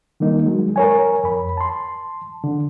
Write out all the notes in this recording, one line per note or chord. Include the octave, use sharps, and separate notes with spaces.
D#3 G3 A#3 D#4
F#3 G#3
A#4 C#5 G#5
F2 B5
A5 C6
D3